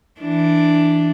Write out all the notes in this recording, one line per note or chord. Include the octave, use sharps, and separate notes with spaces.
E3 D4